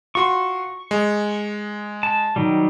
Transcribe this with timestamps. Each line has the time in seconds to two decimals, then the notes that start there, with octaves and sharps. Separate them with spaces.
0.15 F4 F#4 C6 C#6
0.91 G#3
2.03 A5
2.36 D#3 F#3 G3